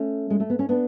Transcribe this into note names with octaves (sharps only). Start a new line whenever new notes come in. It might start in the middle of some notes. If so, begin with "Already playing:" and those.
Already playing: A3 C#4
G#3
A3
B3
C#4
B3 D4